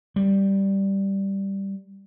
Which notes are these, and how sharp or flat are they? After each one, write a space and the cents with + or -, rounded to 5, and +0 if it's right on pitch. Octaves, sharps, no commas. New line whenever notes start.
G3 +0